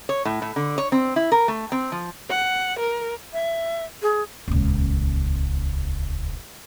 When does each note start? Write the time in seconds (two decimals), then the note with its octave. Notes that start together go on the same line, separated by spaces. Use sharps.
0.09 C#5
0.25 A2
0.42 A2
0.56 D3
0.78 C#5
0.92 C4
1.16 E4
1.32 A#4
1.48 A3
1.72 C4
1.92 F3
2.30 F#5
2.80 A#4
3.33 E5
4.02 G#4
4.48 D#1 C#2